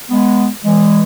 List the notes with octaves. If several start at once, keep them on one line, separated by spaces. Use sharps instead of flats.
G#3 B3
E3 G#3